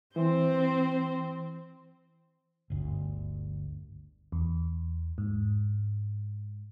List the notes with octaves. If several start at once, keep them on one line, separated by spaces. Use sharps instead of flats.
E3 C4 C5
G1 D2
E2
G#2